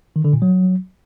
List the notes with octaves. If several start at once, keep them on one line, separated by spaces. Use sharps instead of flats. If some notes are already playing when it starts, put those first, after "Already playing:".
D#3
D3
A#2
F#3